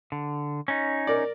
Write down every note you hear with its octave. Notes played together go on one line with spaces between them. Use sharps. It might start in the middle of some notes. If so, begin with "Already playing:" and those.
D3
C#4 D#4
A#4 D5